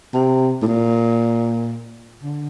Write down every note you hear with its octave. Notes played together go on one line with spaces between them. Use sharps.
C3
A2
A#2
D3